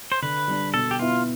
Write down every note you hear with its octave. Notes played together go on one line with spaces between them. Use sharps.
C5
D3 B4
G3 D4
B2 A4
G4
B3 E4 F4